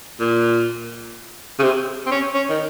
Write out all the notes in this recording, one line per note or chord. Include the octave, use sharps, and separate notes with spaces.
A#2
C#3
C3
C4
C#4
C#4
D#3